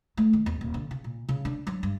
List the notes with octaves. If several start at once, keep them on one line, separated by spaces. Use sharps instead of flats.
A3
D#3
E2
D#1
D3
C#3
A#2
C#3
D4
F#3
G2